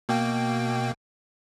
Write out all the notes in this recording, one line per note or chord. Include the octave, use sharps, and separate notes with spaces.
B2 A#3 G5